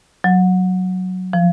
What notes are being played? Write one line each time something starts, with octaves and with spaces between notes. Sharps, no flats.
F#3
F3